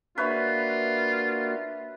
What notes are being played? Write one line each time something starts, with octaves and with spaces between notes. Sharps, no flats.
A#3 D4 F4 F#4 B4 C#5 E5